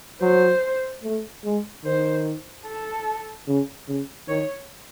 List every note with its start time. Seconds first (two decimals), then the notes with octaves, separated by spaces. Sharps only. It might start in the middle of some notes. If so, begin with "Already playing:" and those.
0.22 F#3 C5
1.04 A3
1.44 G#3
1.84 D#3 C5
2.66 A4
3.47 C#3
3.88 C#3
4.28 D#3 C#5